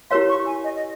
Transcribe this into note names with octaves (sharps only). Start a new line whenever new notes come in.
E4 G4 A#4 C#5 F5 C6
C#6
G#5
D#5
D#5